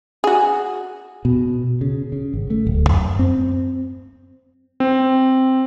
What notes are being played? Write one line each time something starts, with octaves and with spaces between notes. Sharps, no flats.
F#4 G#4
B2
C#3
C#3
G#1
A3
D1
F#2
C4
C4